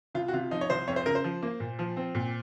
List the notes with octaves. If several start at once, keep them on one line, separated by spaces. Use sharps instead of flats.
C2 F4
F#4
C3 F4
F3 D#4
C#5
C2 C5
F2 C#5
C5
C#3 A#4
C5
F3
A#3
A#2
F3
C4
A#2